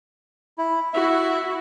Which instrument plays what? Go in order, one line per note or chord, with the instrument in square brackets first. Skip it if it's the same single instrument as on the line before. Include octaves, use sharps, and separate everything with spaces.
[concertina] E4
[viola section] E4 F#4 [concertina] E5